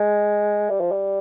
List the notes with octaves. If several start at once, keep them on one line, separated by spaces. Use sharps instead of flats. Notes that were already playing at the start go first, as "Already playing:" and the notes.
Already playing: G#3
G3
F3
G3